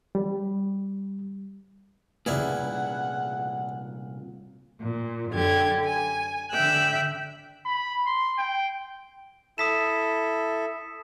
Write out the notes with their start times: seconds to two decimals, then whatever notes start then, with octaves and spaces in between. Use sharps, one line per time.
0.15 G3
2.26 C2 A#2 C#3 G3 E4 G#4 B4 F#5
4.80 A#2
5.31 F#2 D3 G4 G#6
5.83 G#5
6.52 D3 E5 G5 E6 F#6
7.65 B5
8.07 C6
8.38 G5
9.58 E4 A4 D#6 B6 E7